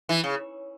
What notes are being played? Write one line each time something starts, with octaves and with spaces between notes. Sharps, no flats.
E3
C#3